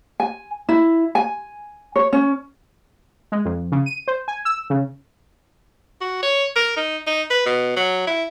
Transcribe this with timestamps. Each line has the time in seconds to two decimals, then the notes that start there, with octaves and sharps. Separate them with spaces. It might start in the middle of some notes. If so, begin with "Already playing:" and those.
0.20 G#5
0.69 E4
1.15 G#5
1.96 C#5
2.13 C#4
3.32 G#3
3.45 F2
3.72 C#3
3.86 D#7
4.08 C5
4.28 G#5
4.45 E6
4.70 C#3
6.01 F#4
6.23 C#5
6.56 A#4
6.77 D#4
7.07 D#4
7.30 B4
7.46 B2
7.77 F#3
8.07 E4